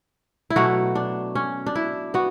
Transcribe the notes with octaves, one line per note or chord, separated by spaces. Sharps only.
E4
B2 F#3 A3 F#4
D4
C#4
D4
E4
B3 F#4